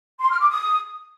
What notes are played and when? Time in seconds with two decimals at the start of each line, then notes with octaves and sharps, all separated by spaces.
0.21 C6
0.31 F6
0.41 D6
0.51 D#6